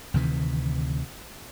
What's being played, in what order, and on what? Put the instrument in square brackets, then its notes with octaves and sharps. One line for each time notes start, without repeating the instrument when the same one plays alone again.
[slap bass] D2 C3 D#3 E3